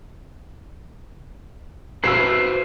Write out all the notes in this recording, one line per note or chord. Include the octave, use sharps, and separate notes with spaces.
F#4 B4 C5 E6 C7